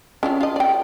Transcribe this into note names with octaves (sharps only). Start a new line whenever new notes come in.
C#4 D4 F4
F4 D#5
D5 G5